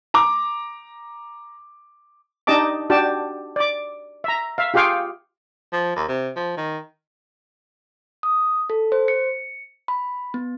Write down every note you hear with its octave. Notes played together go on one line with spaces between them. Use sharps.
A#5 D6
D4 D#4 G4 D#5 A5 D6
D4 F#4 G4 G5 A5
D5 D6
E5 A#5
E5 F5
F4 G4 G#4 F5 G5 C#6
F3
D#2
C3
F3
D#3
D#6
A4
C5
C#7
B5
B3